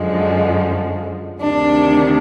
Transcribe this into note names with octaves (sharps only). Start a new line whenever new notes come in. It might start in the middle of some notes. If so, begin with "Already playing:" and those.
Already playing: F#2 D3 F3 G#3
D2 C3 D#3 D4